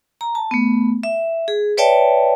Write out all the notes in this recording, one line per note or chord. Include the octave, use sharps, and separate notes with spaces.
A#5
A5
A3 B3
E5
G#4
B4 C#5 D5 E5 G5 A5